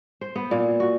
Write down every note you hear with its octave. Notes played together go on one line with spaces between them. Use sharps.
C5
B3
A#2
F#4